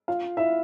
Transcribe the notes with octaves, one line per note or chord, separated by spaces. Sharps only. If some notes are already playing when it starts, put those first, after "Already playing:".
F4 F5
E4 E5